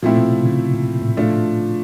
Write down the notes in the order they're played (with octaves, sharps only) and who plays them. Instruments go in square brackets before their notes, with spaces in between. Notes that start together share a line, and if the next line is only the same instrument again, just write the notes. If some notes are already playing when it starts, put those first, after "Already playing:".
[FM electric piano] A#2 [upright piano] F3 A3 C4 E4
[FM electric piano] B2
C3
C#3
C3
A#2
A#2
A2
[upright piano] F3 A3 D4 F4